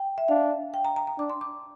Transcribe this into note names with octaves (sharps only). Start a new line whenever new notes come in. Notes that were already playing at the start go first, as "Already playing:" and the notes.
Already playing: G5
E5
D4 F5
G5
A#5
A#5
A#5
D4 D6
C6
D6